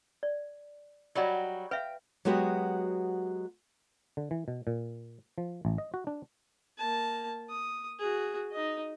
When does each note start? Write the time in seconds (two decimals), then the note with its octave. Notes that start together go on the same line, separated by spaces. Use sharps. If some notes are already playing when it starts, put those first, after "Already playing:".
0.23 D5
1.15 F#3 G3 F#4 D5 D#5
1.71 B4 E5 F5 G5
2.25 F#3 G#3 B3 F#4 G4
4.17 D3
4.31 E3
4.48 B2
4.67 A#2
5.38 F3
5.65 A1
5.78 D#5
5.94 F#4
6.07 D4
6.78 A#3 A5
7.49 D#6
7.99 F#4 G#4
8.51 D#4 D#5